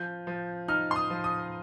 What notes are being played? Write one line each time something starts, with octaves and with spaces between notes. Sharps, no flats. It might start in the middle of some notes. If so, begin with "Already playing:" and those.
Already playing: F3 G6
F3
D#4 F6
C6
D#6
F3
D#6